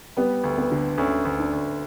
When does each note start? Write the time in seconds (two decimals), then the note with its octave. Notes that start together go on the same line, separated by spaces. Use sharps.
0.17 G3 B3
0.44 D2
0.58 B3
0.72 D3
0.98 D2 C#4
1.25 D2
1.39 D4
1.53 D2